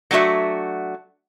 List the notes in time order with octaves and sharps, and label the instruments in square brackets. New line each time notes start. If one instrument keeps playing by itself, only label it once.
[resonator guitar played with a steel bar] F#3 A3 D4 F#4 E5